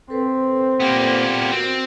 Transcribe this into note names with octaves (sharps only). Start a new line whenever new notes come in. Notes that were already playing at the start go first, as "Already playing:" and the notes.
C4 A4 B4 C5
A#2 A#3 B3 G4 G5
C4 F#4 A#4